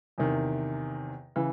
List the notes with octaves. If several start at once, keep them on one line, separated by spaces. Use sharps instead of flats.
E2 C3 D#3
C#3 E3